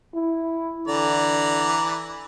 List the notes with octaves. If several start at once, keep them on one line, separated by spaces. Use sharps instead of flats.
E4
D3 E3 D5 A#5